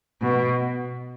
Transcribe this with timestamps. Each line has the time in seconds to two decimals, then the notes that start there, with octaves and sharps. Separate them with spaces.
0.21 B2